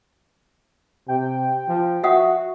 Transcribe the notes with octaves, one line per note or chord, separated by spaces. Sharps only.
C3 G5
F3
F#4 E5 F#5 D#6